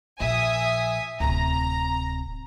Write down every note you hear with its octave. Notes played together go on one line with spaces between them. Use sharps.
A#1 E5 G#5 D#6
D1 C3 A#5